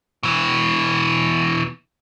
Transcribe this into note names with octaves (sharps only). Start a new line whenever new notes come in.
B2 E3